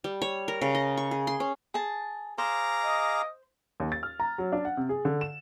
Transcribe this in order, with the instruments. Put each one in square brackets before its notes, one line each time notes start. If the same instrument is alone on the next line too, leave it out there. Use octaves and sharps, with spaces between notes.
[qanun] G3
C#5
A#4
C#3
D#5
C#6
G#4
C6
C#4
[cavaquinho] G#4 A5
[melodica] G#4 F5 D6 [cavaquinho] C5 [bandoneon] A#5
[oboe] D#5
[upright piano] D#2
A6
F6
A#5
F#3
D4
F#5
C3
G#4
D3
E7